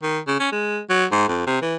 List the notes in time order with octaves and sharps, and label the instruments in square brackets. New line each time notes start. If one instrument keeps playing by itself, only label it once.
[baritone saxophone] D#3
C#3
C#4
G#3
F#3
G#2
F2
C3
E3